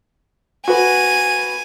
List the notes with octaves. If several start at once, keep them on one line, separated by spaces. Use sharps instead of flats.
F#4 B4 G#5